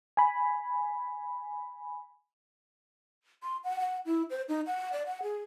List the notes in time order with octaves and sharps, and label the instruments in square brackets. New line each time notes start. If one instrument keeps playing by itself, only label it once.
[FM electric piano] G#5 B5
[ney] C6
F#5
F#5
E4
C5
D#4
F#5
D5
F#5
G#4